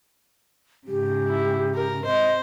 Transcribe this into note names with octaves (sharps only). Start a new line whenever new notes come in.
G#2 C#3 G4
E4
A#4
C3 C5 D#5